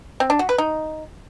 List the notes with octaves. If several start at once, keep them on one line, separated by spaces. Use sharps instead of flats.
C4
D4
F#4
B4
D#4